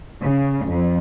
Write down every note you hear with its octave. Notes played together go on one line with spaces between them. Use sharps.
C#3
F2